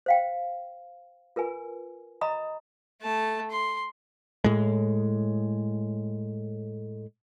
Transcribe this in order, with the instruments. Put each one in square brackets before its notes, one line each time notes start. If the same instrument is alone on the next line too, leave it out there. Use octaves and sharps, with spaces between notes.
[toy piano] C5 F5 G5
F4 A#4 B4 G#5
D#5 A#5 B5 D#6
[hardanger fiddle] A3 A5
C6
[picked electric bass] A2 G#3